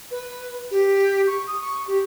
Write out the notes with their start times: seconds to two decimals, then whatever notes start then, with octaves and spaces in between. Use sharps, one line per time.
0.11 B4
0.71 G4
1.27 C#6
1.47 D#6
1.61 C#6
1.88 G4